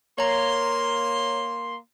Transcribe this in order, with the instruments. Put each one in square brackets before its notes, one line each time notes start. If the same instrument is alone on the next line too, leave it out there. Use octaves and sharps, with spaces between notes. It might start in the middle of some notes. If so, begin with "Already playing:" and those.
[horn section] A#3 C6 [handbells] C#5 A#5